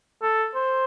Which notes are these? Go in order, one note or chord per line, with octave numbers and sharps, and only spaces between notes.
A4
C5